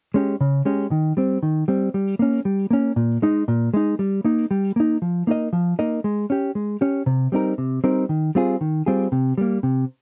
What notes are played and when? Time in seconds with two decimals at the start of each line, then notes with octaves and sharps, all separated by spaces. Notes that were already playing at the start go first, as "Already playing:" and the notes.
0.14 G#3 C#4 G4
0.41 C#3
0.65 G#3 C#4 G4
0.91 D#3
1.17 G3 C4
1.43 D#3
1.68 G3 C4
1.94 G3
2.19 A#3 C#4
2.45 G3
2.71 A#3 C#4
2.96 A#2
3.22 G#3 D#4
3.48 A#2
3.74 G#3 D#4
3.99 G3
4.25 A#3 D#4
4.51 G3
4.76 A#3 D#4
5.02 F3
5.27 A#3 D#4 A#4 D#5
5.53 F3
5.79 A#3 D#4 A#4 D#5
6.04 G#3
6.30 C#4 G4
6.55 G#3
6.81 C#4 G4
7.06 C3
7.32 G3 C4 D#4 A#4
7.58 C3
7.84 G3 C4 D#4 A#4
8.09 D#3
8.35 G3 C4 F4 G#4
8.61 D#3
8.86 G3 C4 F4 G#4
9.12 C3
9.38 G3 A#3
9.63 C3